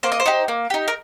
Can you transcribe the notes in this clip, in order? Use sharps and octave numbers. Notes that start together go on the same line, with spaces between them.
A#3 C5
D#5
C5
D#4 G4
A#3
D#4 G4
A#4